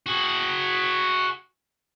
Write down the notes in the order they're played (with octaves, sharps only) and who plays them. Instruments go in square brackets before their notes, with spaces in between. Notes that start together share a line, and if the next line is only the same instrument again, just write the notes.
[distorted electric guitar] F#4 G#4